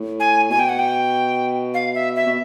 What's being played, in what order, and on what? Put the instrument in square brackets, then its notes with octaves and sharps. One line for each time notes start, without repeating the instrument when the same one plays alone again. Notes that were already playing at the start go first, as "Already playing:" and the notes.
Already playing: [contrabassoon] A2
[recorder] G#5
[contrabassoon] B2 [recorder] G#5
[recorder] G5
F#5
G5
F5
E5
E5
[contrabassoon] B2